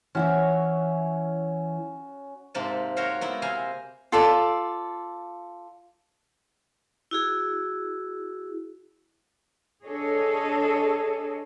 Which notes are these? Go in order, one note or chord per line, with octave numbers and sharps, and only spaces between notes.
E3 C#4 E4 F#4 C#5
G#2 C3 A#3 A5
F#4 A#4 C5 C#5 F5
A#3 B3 E4 B4
C3 C5 F5 G#5 A#5
F4 A4 D5
E4 F#4 G#4
D4 G#4 A4 C#5 D#5